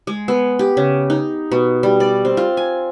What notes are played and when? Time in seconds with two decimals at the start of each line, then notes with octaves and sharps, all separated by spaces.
0.07 G#3
0.28 B3
0.59 G4
0.77 C#3
1.10 D#4
1.51 B2
1.83 G3
2.00 D5
2.25 C4
2.37 F4
2.57 G#5